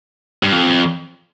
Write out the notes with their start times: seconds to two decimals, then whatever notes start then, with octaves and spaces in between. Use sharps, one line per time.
0.43 G2
0.52 F2